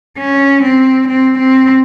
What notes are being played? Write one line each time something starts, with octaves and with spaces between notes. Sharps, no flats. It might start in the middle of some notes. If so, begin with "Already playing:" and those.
C#4
C4
C4
C4